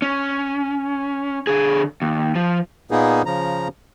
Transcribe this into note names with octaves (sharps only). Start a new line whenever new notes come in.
C#4
D3 G#4
D#2
F3
A#2 A#3 B3 D#4 G#4
C#3 F3 A#5